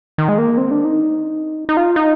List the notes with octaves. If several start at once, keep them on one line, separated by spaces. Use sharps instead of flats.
D#3
G#3
A#3
C4
D4
D#4
D#4
F4
D#4